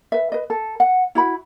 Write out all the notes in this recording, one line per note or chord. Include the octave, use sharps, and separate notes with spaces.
B4 E5
B4 D#5
A4
F#5
E4 F#4 B5